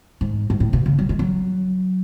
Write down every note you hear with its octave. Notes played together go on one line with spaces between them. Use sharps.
G#2
G#2
A2
B2
C#3
F#3
G#3
F#3